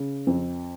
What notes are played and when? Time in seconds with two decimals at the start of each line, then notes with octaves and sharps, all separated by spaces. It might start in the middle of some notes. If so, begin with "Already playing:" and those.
Already playing: C#3
0.27 F2